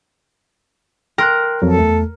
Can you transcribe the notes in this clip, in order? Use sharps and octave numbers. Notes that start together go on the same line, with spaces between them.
A#4 G5 C6 F#6
F2 F#3 A4
E2 A3